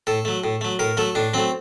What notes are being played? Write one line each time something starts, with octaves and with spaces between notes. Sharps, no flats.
A2 A4
F#3 A3
A2
F#3 A3
A2 A#4
F#3 A3 A4
A2 D4
F#3 A3 C4